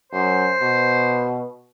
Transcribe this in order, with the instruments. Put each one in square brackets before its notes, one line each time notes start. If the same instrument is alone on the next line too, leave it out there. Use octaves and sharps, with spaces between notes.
[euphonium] F#2 [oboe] C5
[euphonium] B2